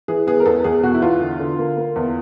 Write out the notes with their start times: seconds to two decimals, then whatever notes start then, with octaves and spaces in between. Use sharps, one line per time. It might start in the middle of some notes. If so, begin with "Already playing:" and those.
0.08 E3 G#4
0.27 B3 G#4
0.40 A#4
0.46 E2 A4
0.64 E2 G#4
0.83 B2 F#4
0.94 E4
1.02 E2 F4
1.21 D3
1.40 D3
1.59 A#3
1.77 A#3
1.96 E2